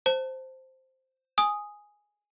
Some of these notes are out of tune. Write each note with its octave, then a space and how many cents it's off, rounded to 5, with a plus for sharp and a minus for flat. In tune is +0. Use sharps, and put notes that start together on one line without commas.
C5 +0 A5 +20
G#5 +0 D#6 +0